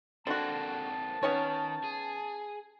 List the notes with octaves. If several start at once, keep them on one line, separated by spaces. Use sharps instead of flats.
D3 A#3 C4 F#4 A5
D#3 B3 C#4 C#5
G#4